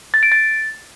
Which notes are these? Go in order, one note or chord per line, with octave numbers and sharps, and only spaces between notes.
A6
D7
A6